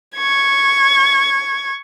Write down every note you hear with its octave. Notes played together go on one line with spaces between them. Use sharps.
C#6 G#6